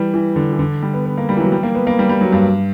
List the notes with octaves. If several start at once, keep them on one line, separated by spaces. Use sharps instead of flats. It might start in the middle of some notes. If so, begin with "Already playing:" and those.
Already playing: E3 G3
E3
D3
E3
D3
G3
B3
B3
A#3
G3
E3
F#3
G3
A#3
B3
A#3
G3
G3
F#3
G2